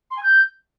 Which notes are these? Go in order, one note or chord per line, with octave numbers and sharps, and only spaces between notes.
C6
G#5
G6